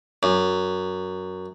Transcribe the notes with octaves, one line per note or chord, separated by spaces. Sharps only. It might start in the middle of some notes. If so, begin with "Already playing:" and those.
F#2